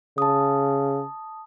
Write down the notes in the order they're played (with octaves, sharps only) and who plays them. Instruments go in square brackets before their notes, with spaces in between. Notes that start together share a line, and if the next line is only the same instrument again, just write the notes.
[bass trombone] C#3 [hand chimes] A5 D#6